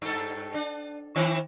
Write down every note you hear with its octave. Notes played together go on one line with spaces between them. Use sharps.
G2 A4
D4
D#3 C4 E4